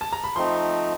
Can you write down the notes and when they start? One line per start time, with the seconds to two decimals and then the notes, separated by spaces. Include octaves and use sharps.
0.01 A5
0.13 A#5
0.24 B5
0.36 F3 A3 C4 D#4 C6